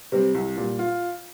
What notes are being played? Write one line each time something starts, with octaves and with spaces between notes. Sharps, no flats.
C3 G3 C4
C2
A#2 G3
F4